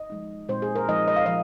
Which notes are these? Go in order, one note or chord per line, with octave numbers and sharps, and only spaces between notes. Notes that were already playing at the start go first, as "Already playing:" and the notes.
Already playing: D#5
F3 G#3 D#4
A#2 G#3 C4 D#4 C5
G#4
A#4
F3 G#3 D#4 D#5
D#5
F5
F3 D#5